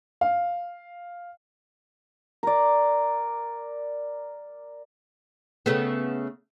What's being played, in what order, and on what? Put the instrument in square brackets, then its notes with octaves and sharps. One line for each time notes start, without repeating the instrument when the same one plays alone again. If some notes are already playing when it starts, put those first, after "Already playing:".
[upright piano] F5
[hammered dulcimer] A#4 D5
[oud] C#3 A3 B3